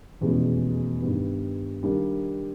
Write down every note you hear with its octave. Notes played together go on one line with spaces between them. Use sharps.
F1 E2 B2 G#3 C#4
G2 D#3 G3 B3
D#3 G3 A#3 D4